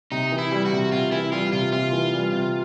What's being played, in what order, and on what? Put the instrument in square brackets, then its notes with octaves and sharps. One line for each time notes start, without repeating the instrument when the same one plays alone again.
[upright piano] C3 [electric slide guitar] D#4
[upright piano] E3
[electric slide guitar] E4
[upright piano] G3
[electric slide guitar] F#4
[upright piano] C3
[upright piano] C3 [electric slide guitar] F4
[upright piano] E3 [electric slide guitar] E4
[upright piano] G3 [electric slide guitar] F4
[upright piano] C3 [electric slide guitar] F4
[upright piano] C3 [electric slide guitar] F4
[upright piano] E3
G3
C3